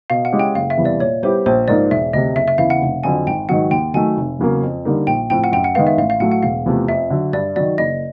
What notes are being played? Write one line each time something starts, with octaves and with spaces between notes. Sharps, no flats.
B2 F5
F#5
G#3 C#4 E4 G4
G5
F#1 F5
E5
E2 C3 E3 G3
D5
A#2 C#5
G3 B3 E4 G4 C5
A#1 C5
G#2 F3 A#3 D#4 D5
E1 E5
D2 C3 D#5
F#1 E5
E5
E2 C#3 E3 F5
F#5
F1
F2 D3 F#3 G#5
G#1 G5
G#2 D#3 F#3 F#5
D#2 G5
D#3 F#3 A3 G#5
F1
E2 C#3 F#3 A#3
F2
D3 G3 A#3 D#4
A#1 G5
A2 F3 A3 C4 G5
F#5
F#2 G5
F#5
D#3 G#3 B3 F5
E5
A1 F5
F5
A2 F#3 A3 F#5
F#5
E1 F5
E2 C3 F3 A3
F2 E5
D3 F#3
G2 D5
D#3 F#3 D5
F#1 D#5